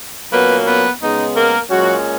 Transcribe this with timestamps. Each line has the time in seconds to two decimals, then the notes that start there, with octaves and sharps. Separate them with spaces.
0.31 A#2 F#3 A#3 B3 C#4 B4
0.66 B3 B4
1.01 C#3 G#3 B3 D#4
1.36 A#3 A#4
1.70 A#2 F#3 G#3 C#4 F#4